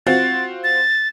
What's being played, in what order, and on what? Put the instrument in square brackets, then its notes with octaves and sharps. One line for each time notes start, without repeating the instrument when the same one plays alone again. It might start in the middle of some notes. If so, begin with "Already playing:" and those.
[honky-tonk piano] C4 F4 F#4 [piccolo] A6
[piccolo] A6